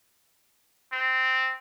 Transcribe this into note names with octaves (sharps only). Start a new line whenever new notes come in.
C4